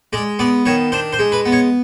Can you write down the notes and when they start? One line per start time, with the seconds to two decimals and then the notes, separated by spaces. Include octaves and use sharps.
0.13 G#3 D5
0.39 B3 D5
0.66 D#3 C#5
0.92 D4 C5
1.13 C5
1.19 G#3
1.32 B4
1.45 B3
1.52 C#5